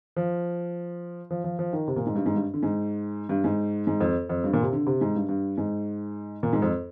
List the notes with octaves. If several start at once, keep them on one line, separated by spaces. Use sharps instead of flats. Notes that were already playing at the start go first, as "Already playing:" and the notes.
F3
F3
F3
F3
D#3
C3
A#2
G#2
G2
G#2
G2
D3
G#2
G2
G#2
G#2
F2
F2
G2
A#2
C3
D3
C3
G#2
G2
G2
G#2
A#2
G#2
F2